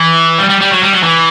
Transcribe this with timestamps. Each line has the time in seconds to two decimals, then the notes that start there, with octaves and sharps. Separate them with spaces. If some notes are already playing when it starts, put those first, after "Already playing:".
Already playing: E3
0.39 G3
0.50 G3
0.61 G3
0.71 F#3
0.82 G3
0.93 F#3
1.03 E3